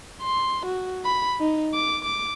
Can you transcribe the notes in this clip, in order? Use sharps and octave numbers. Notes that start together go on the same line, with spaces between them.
C6
F#4
B5
D#4
D6
D6